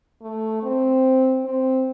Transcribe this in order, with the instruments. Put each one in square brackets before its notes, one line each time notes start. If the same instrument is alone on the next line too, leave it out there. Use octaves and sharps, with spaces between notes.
[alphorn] A3
C4
C4